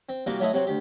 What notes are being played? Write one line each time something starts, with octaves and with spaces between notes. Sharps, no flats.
C4
C2 G3 A#3 F#4 D6
F#3 A3 E4 A4 D#5 E5
C3 F#3 C4 F#4
D2 G4